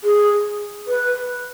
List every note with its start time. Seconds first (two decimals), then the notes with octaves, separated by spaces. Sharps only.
0.04 G#4
0.87 B4